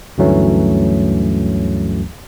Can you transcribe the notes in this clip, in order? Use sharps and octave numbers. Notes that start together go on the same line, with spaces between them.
D2 G2 E3 F#3 A3 C#4